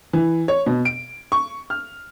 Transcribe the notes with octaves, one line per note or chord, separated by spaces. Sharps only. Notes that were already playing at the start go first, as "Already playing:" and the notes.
E3
C#5
B2
D7
C#6
F6